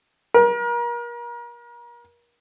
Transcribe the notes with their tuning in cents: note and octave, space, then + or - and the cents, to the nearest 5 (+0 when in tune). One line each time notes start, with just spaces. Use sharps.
A#4 +35